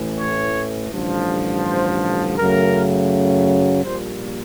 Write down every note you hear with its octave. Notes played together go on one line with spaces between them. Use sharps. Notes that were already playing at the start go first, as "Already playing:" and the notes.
Already playing: A1 A2 E3
C#5
A1 G2 D3 F3
C5
F#2 C#3 F#3 A3 A#4
A#1 A#2 G3 C5